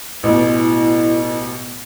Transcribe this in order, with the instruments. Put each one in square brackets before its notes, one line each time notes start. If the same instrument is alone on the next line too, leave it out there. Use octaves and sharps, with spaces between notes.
[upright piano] A1 B2 [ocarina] E4